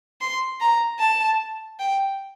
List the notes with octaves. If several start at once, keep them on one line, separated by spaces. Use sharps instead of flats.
C6
A#5
A5
G5